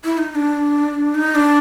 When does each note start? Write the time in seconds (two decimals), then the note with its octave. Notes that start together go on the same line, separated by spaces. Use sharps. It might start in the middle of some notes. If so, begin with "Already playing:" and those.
0.05 E4
0.18 D#4
0.31 D#4
0.35 D4
1.15 D#4
1.35 D4